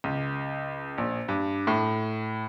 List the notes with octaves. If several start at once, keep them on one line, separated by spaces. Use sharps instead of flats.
C#2
A#1
G2
A2